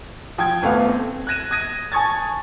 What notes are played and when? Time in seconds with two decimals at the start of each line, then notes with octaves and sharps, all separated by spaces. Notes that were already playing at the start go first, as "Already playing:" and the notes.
0.38 F3 G5 D#6 G#6
0.62 D#1 A3 B3 F5
0.88 C4
1.27 F#6 G#6 A#6 D#7 E7
1.51 D#6 G#6 A#6 D#7
1.92 G#5 A5 C#6 D#6 G#6 A6